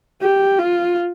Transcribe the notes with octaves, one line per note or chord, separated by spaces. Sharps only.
G4
F4